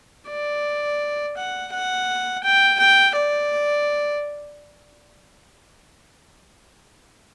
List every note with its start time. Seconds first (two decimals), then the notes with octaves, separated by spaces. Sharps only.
0.29 D5
1.37 F#5
1.73 F#5
2.43 G5
2.79 G5
3.16 D5